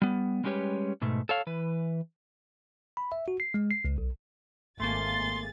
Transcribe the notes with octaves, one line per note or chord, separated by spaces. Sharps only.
G3 B3
G3 G#3 C#4 G4 B4 C#5
G#2 B2 A3
A4 C#5 F5
E3 B4
B5
E5
F#4
C7
G#3
C7
C#2
B1
G#1 A3 A#3 G#4 C6 A6